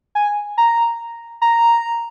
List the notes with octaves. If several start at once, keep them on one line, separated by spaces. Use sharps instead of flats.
G#5
A#5
A#5